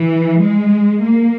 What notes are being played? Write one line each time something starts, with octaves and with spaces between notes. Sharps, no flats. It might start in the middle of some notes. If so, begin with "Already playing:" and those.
Already playing: E3
G#3
A#3